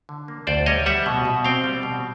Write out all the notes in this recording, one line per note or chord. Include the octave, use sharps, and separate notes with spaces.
D3
A#3
D2 C5 D5
G3 C#5 D#5
G3 E5 F#5
B2
B2
C4 F5 G5
G3
B2